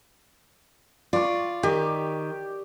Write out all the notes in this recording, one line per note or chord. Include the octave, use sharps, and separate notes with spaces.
F4 D5 C#6
D#3 G4